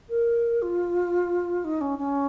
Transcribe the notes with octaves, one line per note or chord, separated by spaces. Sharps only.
A#4
F4
D#4
C#4
C#4